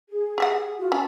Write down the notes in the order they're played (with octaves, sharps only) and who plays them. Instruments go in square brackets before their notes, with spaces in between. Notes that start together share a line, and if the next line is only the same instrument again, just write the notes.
[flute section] G#4
[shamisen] G4 E5 F#5
[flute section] F4 F#4
[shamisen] C#4 [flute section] A5